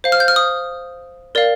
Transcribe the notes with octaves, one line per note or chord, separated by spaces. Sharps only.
C5 F5
F6
G6
F6
D#6
A#4 D5 F5